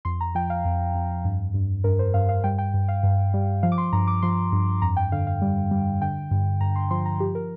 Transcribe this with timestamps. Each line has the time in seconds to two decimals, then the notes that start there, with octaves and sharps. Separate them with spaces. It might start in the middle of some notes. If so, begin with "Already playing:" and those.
0.05 F2 C6
0.21 A#5
0.35 F3 G5
0.50 F5
0.65 F2
0.95 F2
1.25 G2
1.54 G2
1.84 G2 A#4
1.99 C5
2.14 G2 F5
2.29 F5
2.44 G3 G5
2.58 G5
2.74 G2
2.88 F5
3.03 G2
3.34 G3
3.63 F3 F5
3.72 D6
3.78 C6
3.93 G2 A#5
4.07 D6
4.22 F3 C6
4.52 G2
4.82 F2 A#5
4.97 G5
5.12 D3 F5
5.27 F5
5.42 G3
5.71 G3
6.01 D3 G5
6.31 G2
6.61 G2 A#5
6.76 C6
6.91 F3 C6
7.06 A#5
7.20 F3 G4
7.35 A#4